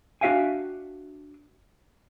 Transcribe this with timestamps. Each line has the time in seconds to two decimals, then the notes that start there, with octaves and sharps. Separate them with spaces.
0.21 D4 F#4 E5 F5 G5 G#5